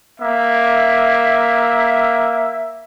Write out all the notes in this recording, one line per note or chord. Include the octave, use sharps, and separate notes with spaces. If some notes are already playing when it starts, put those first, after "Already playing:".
A#3 E5